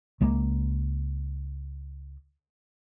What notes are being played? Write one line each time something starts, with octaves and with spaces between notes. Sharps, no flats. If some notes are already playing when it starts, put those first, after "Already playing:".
C#2 G#3 A#3